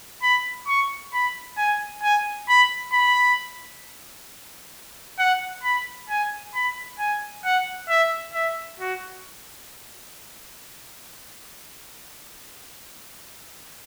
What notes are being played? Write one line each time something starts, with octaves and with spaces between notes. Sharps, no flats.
B5
C#6
B5
G#5
G#5
B5
B5
F#5
B5
G#5
B5
G#5
F#5
E5
E5
F#4